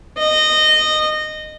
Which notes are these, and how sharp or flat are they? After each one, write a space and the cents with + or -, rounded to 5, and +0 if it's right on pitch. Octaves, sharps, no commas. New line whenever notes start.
D#5 -20